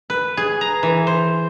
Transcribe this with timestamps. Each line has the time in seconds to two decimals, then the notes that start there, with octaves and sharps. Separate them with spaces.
0.10 B4
0.37 G#4
0.61 A#5
0.83 E3
1.07 C5